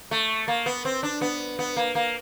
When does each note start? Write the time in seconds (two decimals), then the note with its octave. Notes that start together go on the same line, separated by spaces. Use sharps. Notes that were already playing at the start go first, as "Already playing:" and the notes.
0.11 A3
0.48 A#3
0.66 B3
0.85 C4
1.03 D4
1.21 B3
1.59 B3
1.76 A#3
1.95 A#3